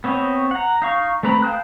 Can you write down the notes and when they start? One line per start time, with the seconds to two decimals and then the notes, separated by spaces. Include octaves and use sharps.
0.04 B3 C4 C#5 D#5
0.51 F#5 A#5
0.82 D#4 F5 C#6
1.23 A3 C4 B4 A#5 B5
1.42 F5 G5 A5 D#6 F#6